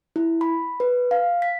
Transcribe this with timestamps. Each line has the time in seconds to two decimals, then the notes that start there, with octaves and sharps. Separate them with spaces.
0.16 E4
0.41 B5
0.80 B4
1.11 F5
1.42 B6